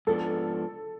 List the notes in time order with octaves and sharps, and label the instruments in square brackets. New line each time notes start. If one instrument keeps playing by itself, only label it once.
[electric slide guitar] G#2 F3 B3 D4 [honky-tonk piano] A4